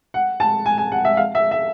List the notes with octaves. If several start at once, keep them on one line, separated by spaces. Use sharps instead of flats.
F#5
A5
G#5
G#5
F#5
E5
F5
E5
E5